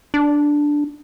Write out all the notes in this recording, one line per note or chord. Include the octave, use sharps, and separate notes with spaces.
D4